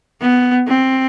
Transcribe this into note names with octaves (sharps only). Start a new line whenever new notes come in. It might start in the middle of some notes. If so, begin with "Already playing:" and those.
B3
C4